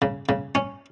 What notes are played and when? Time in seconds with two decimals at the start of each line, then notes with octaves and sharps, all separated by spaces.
0.02 C#3
0.29 C#3
0.55 C#4